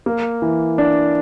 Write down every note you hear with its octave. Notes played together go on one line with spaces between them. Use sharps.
A#3
E3
D4